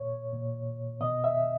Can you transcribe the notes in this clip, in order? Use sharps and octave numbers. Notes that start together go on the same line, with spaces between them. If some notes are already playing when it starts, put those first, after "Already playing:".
Already playing: A#2 C#5
A#2
B2 D#5
E5